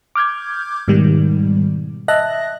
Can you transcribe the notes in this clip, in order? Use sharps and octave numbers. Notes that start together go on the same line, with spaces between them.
D6 F6 G6 G#6
G#2 B2 D#3 G3
D#5 E5 A5 F#6 A#6